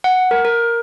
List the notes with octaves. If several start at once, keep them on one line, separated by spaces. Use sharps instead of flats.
F#5
A#4
A#4